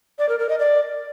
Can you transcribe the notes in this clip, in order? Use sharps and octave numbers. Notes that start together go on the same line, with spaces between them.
D5
A#4
A#4
D#5
D5